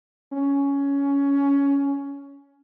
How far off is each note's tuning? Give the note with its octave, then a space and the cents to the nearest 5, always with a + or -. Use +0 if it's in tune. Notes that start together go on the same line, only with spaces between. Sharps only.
C#4 +15